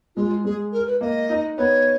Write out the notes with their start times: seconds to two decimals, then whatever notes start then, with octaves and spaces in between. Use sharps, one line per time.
0.16 G#3 F4
0.44 G#3 G#4
0.72 A#4
0.87 B4
1.01 A#3 D#5
1.29 D#4
1.57 B3 C#5